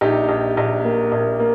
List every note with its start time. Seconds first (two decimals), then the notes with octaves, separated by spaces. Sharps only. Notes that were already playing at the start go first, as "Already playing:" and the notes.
0.01 A#1 D#4 G4
0.29 A#1
0.57 A#1
0.85 A#3
1.12 A#1
1.39 A#3